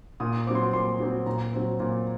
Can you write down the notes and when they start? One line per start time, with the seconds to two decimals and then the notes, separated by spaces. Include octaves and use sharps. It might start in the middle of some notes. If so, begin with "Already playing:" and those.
0.20 A#2 D#6
0.47 C4 D6
0.51 F#3 C6
0.63 D6
0.73 A#2 C6
1.00 F#3 C4
1.26 A#2 A#5
1.53 F#3 C4
1.80 A#2